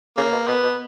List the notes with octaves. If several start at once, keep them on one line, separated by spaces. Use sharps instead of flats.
C#3 A#3
B2
B2 B3
B2